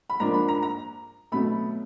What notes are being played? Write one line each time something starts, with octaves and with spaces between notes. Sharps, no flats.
B5
G#2 F3 A#3 D4 A#5
B5
A#5
A#5
B2 F#3 A3 B5